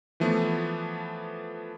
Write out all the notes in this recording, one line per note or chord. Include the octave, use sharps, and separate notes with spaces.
E3 F3 A3 B3